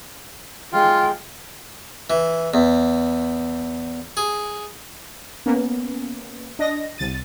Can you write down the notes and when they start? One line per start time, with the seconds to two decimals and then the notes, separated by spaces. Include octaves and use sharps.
0.74 G#3 F4 G5
2.10 E3
2.54 E2
4.17 G#4
5.46 A#3 B3 C#4
6.59 D4 D#5 A#6
6.98 C2 A6 D#7